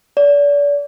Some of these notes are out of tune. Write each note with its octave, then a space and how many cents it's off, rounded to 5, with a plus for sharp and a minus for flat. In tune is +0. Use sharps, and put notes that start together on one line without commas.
D5 -35